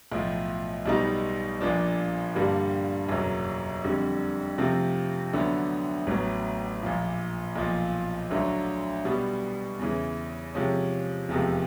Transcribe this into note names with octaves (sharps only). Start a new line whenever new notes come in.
B1 A2 F3
B1 B2 G3 B3 D#4
A#1 A#2 F3 A#3 D4
G2 D3 G3 A#3
F#1 E2 B2 F#3
F2 D3 G3
F2 C3 F3 A3 C4
D2 D3 F#3 B3
A1 A2 F#3 B3
A#1 A#2 F3
B1 A#2 F3
D2 D3 F#3
B2 G3 B3
E2 C#3 E3
C3 F3 G#3 C#4
F1 E2 C3 F3 G#3